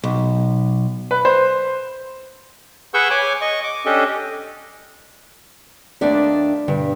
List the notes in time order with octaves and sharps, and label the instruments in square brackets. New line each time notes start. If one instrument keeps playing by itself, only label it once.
[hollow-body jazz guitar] B1
[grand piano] B4
C5
[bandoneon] G#4 B4 F#5 C#6 E6 G6
C#5 G#5 D6
D#5 C#6
D6
C#4 D4 G4 A4 D#5
[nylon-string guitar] D#2 D4 E5 [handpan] A3 D5
[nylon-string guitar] G2 [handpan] B2 D3